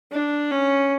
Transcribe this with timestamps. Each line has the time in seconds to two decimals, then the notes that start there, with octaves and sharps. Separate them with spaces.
0.12 D4
0.50 C#4